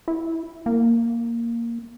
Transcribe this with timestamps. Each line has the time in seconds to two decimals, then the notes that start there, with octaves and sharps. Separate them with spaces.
0.08 E4
0.66 A#3